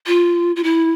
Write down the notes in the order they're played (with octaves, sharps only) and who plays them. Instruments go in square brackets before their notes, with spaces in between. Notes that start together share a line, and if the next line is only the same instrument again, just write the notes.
[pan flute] F4
F4
E4